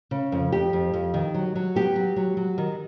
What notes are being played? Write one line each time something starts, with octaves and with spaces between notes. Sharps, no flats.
C#3
F2
F2 G4
F2
F2
D#3
F#3
F#3
B3 G4
F#3
F#3
F#3
D#3